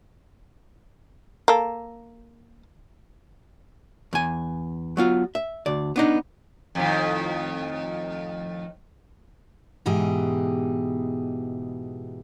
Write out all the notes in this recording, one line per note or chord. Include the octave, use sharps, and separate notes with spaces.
A#3 A4
E2 G#5
F#3 B3 F4
E5
D2 D5
B3 D4 D#4
F2 A2 D#3
G#2 B2 E3 G4 G#4